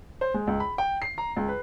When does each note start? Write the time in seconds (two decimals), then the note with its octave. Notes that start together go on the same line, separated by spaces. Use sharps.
0.21 C5
0.34 G#3
0.47 C#2
0.60 B5
0.78 G5
1.02 C7
1.18 A#5
1.36 C#2
1.48 B4